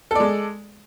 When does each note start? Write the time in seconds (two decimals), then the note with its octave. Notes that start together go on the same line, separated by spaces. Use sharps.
0.11 A4
0.15 D5
0.20 G#3